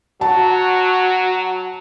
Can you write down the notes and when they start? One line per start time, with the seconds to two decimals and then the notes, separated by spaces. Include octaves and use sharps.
0.21 F#3 F#4 A5